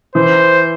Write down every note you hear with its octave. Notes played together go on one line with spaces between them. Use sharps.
E3 C5